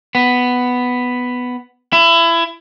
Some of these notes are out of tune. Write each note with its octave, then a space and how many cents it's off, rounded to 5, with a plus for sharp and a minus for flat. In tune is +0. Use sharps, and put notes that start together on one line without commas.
B3 +5
E4 +25